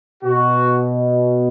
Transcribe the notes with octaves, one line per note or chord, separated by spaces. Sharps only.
B2 F#4